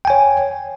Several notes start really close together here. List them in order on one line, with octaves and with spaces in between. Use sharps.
G5 G#5 C#5